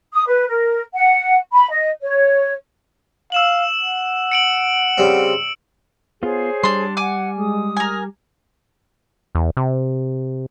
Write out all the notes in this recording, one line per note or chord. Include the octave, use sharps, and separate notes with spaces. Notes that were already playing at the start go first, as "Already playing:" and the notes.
D#6
B4
A#4
F#5
B5
D#5
C#5
F5 E6 E7 F#7
F#5
C#7 D7 F#7
C#3 G3 C4
B3 F4 G#4 C5 C#5
G3 D4 C6
F#5 G#5 D6
G#3 D#6
A#4 G#5
E2
C3